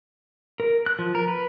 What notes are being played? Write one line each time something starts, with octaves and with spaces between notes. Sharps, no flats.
A#4
F#6
F3
A#4
B4